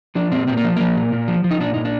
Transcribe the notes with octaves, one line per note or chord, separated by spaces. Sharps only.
F3 D4
A#2 C4
A#2 C4
A#3
F3
F3 A#3
A#2
A#2
F3
F3
D#4
A#2 D4
A#2 D#4
D4